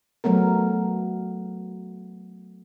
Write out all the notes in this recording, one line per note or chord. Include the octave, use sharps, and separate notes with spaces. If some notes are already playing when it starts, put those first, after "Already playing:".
F#3 A3 B3 A#4